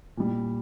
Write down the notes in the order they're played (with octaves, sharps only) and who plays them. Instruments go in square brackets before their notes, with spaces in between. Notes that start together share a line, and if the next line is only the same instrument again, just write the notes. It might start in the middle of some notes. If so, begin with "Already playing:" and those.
[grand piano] A#2 G3